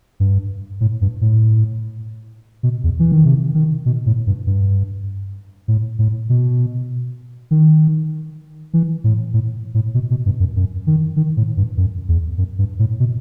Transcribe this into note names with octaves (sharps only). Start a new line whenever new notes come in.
G2
A2
G2
A2
B2
E2
E3
D#3
C3
D#3
B2
A2
G2
G2
A2
A2
B2
D#3
E3
A2
A2
A2
B2
B2
G2
F#2
F#2
D#3
D#3
A2
G2
F#2
E2
F#2
G2
A2
B2